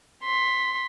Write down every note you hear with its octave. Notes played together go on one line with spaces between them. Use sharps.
C6 B6